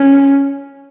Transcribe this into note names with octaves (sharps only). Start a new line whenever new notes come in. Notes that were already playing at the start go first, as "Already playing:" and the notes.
Already playing: C#4